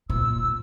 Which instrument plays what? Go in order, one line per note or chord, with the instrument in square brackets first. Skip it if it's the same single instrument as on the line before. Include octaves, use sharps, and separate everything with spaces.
[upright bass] A#2 [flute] E6